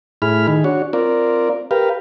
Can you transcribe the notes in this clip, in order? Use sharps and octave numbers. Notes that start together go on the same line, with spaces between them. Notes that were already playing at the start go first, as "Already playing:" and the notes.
A2 E4 G#4 B5 F6
D#3 G#4
D4 F#4 C#5
C4 F4 A#4 D5
G4 A#4 B4 F5